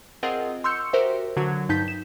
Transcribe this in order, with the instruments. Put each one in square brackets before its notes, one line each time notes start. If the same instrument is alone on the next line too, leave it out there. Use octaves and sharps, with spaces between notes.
[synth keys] C4 F4 G#4 A#4 D#5 F#5
C6 C#6 E6 F6 G6 C#7
F#4 G4 A#4 C5 E5
D3 F#3 F#4 G#6
G2 D#4 A5 G6 B6
E7